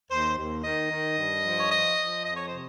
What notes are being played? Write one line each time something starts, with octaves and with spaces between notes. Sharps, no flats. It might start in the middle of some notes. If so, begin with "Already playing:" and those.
D#2 C5
D#2
D#3 D#5
D#3
G2
F3
C#5
F3 D#5
F3
F2 D#5
C#5
C5
C3